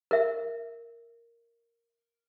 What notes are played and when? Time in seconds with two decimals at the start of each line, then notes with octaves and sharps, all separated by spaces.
0.11 A#4 E5